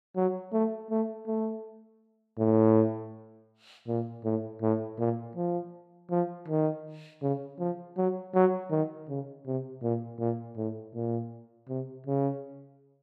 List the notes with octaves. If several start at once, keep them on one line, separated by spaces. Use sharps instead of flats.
F#3
A3
A3
A3
A2
A#2
A2
A2
A#2
F3
F3
D#3
C#3
F3
F#3
F#3
D#3
C#3
C3
A#2
A#2
A2
A#2
C3
C#3